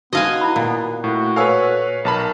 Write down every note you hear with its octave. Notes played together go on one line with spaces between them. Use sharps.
B3 D#4 F#4 D#5 F5 G#5
E4 B5
A#2
A2 F#4
A4 B4 C#5 F5 G#5 E6
B1 A#4 A5 B5